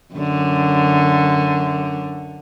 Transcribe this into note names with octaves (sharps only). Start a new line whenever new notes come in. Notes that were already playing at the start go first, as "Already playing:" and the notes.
F#2 D3